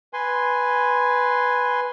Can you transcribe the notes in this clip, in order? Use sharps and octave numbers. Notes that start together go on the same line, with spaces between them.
B4 G#5 C6